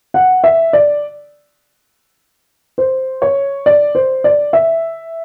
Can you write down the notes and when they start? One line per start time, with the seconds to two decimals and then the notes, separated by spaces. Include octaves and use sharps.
0.14 F#5
0.44 E5
0.73 D5
2.78 C5
3.22 C#5
3.66 D5
3.95 C5
4.24 D5
4.53 E5